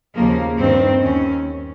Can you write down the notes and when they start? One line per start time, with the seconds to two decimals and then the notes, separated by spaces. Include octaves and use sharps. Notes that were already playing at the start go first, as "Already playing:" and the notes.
0.16 D#2 C#3 F3 A#3
0.58 G2 D#3 C4
1.01 D#2 D#3 C#4